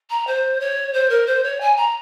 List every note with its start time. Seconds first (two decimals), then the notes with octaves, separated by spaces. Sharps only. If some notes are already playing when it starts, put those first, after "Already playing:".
0.10 A#5
0.27 C5
0.60 C#5
0.93 C5
1.10 A#4
1.26 C5
1.43 C#5
1.60 G#5
1.77 A#5